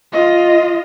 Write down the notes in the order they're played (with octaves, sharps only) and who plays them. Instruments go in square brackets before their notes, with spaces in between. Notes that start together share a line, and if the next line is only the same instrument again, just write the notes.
[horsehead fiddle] F4 D#5